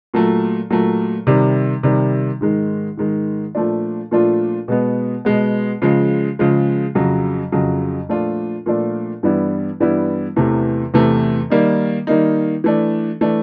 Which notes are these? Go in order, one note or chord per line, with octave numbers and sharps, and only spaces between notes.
A#2 F#3 A3
A#2 F#3 A3
C3 D#3 G3
C3 D#3 G3
G#2 D#3 G#3
G#2 D#3 G#3
A#2 F3 A3 D4 F4
A#2 F3 A3 D4 F4
B2 G#3 B3
B2 G#3 B3
C#3 F3 G#3
C#3 F3 G#3
F2 C#3 F#3
F2 C#3 F#3
A#2 F3 A3 D4 F4
A#2 F3 A3 D4 F4
G2 E3 G3 B3 E4
G2 E3 G3 B3 E4
E2 C3 E3 A3
E2 C3 E3 A3
D#3 G3 A#3 D#4
D#3 G3 A#3 D#4
E3 A3 D4
E3 A3 D4